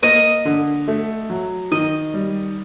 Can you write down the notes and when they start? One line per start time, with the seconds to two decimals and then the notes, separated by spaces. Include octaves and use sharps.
0.02 A#3 D#5
0.45 D3
0.88 A3
1.30 F#3
1.72 D#3 D#5
2.14 G3